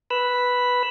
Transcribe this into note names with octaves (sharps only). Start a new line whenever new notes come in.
B4 B5 E6